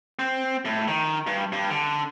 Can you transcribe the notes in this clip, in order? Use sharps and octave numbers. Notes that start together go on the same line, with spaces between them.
C4
A2
D#3
G2
G2
D3